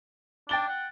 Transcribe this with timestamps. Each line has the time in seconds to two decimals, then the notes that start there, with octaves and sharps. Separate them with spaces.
0.49 D4 G5 A6 G7
0.68 F#5